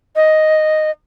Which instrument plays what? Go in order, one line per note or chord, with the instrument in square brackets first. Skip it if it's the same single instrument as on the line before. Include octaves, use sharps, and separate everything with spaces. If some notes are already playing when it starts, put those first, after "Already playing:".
[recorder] D#5